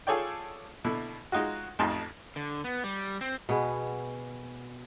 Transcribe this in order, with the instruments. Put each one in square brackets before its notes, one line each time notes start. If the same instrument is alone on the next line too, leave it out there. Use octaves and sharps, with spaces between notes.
[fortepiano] F4 G#4 A4 C#5 D5 G5
B2 D3 E4
G#3 D#4 F4 F#4
A1 F2 D#4 A5 C6
[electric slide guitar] D3
B3
G3
C4
[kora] B2 B3 G#4